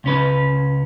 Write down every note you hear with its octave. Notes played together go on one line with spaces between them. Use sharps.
C#2 C#4 B4